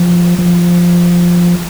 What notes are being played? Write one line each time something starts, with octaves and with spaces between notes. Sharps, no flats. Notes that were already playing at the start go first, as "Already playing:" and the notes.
Already playing: F3
F3